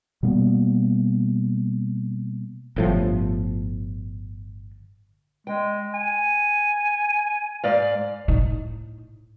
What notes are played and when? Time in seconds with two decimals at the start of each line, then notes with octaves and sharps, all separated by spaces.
0.23 B2 G3 A#3 B3
2.76 G1 A2 F3
5.47 G#3 G5
5.94 G#5
7.63 G#2 D5 F5
8.28 A2 D#4